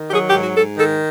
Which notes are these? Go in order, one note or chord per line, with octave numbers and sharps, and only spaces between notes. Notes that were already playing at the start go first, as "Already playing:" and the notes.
Already playing: D#3
G4
F#3 G#4
G4
G#2
F#4
G#2 A4
D#3 A4